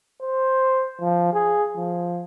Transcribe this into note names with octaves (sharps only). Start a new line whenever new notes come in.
C5
F3
G#4
F3